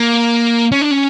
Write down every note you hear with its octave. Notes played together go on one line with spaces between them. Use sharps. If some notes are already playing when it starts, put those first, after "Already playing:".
Already playing: A#3
C#4
D4
C#4